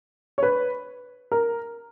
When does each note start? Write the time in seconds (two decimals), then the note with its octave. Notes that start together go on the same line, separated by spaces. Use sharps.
0.38 C#5
0.43 B4
1.32 A#4